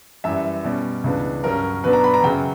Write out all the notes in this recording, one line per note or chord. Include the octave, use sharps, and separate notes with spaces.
F#2 E3 G3 E5
B2 G3 C#4
C#2 C#3 E3 B3 D4
G2 F#3 C#4 A#4
B2 F#3 B3 D4 B4
A#5
B5
A#5
F#2 C#3 F#3 G5